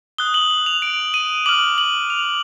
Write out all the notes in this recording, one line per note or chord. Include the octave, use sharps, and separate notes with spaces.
D#6 F#6 G7
F#7
F#7
F7
D7
D#7
D6 F6 F#7
F#7
F7